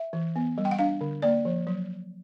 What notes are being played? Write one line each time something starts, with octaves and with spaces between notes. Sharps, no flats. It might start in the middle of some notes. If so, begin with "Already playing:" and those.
Already playing: E5
E3
B3
G3
G5
F#5
D4 F5
D3
A#3 D5
F3
F#3